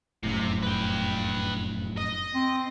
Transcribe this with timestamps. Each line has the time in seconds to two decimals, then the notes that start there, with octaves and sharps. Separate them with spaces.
0.23 F1 F#2 A2 C3
0.63 B4 G5
1.97 D#5
2.35 C4